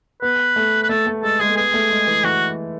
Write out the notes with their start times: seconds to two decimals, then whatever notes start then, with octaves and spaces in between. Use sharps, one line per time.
0.22 B3 B4
0.56 A3
0.83 B4
0.89 A3 A4
1.06 A3
1.23 G#3 A4
1.40 G#3 G#4
1.49 A3
1.57 B3 G#4
1.74 A3
1.90 G#3
2.07 E3
2.23 E3 F#4